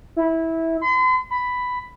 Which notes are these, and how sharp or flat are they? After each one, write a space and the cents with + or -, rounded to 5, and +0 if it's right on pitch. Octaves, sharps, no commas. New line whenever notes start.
E4 -15
C6 -45
B5 +5